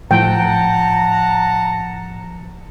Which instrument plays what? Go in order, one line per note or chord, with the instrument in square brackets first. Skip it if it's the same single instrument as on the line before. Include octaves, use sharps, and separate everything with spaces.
[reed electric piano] A2 F3 [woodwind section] F#5 A5 A#5 [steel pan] G5